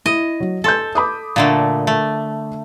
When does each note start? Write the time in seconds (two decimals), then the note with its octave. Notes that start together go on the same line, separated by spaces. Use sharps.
0.06 E4 D#5
0.40 F#3
0.64 A4 G#5 C6 G6
0.95 B5 D6 D#6
1.36 A#2 D3 A3
1.87 A3